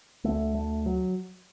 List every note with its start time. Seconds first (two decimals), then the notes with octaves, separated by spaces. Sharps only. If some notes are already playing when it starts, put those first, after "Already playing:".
0.24 D2 D3 A3
0.55 A3
0.86 F#3